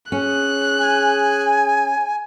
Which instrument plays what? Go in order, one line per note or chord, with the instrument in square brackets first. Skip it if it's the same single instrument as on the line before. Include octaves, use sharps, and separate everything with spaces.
[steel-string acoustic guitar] C#4 [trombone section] G#4 [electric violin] F#6
[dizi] G#5